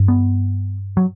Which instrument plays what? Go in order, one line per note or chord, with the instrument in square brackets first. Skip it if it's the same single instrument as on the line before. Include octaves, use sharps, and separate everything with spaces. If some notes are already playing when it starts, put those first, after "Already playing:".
Already playing: [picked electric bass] G2
B3
F#3